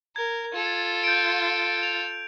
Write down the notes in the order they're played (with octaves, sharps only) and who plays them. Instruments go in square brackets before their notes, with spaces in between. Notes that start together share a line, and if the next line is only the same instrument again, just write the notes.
[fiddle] A#4 [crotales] G#6
[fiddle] F4 A4
[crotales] G6 D7
F7